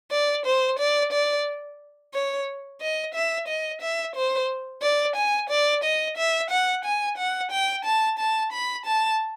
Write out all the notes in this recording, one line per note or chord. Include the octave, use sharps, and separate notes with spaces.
D5
C5
D5
D5
C#5
D#5
E5
D#5
E5
C5
D5
G#5
D5
D#5
E5
F#5
G#5
F#5
G5
A5
A5
B5
A5